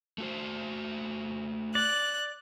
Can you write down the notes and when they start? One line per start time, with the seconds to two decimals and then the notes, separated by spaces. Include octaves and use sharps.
0.18 A3 F#4 C5
1.75 D5 F#6